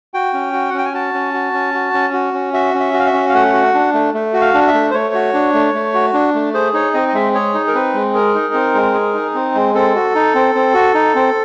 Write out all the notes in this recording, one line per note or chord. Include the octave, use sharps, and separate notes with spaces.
F#4 G5
C#4
F#4
F#5
C#4 G5
G#5
F#4 A5
C#4
F#4
C#4
F#4
C#4
F#4
C#4
F#4 E5
C#4
E5
F#4
F5
E5
C#4
F5
A3 F#5
F#4
D4
A3
A3
F#4
F5
D4
E5
A3
C5
A3 C#5
F#4
D4
A3
A3
F#4
D4
A3
G#4 C5
D#4 C#5
C4 D#5
D#5
G#3 E5
G#4 C#5
D#4
A#4
C4 B4
G#3
G#4 A#4
D#4
C4
G#3
G#4
D#4
C4
G#3
C4 A4
F#4
D#4
C4
C4
F#4
D#4
C4